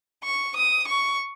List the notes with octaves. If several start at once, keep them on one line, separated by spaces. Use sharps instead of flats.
C#6
D#6
C#6